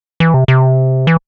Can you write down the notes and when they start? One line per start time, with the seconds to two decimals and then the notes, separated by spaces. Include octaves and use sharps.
0.20 E3
0.34 C3
0.48 C3
1.07 E3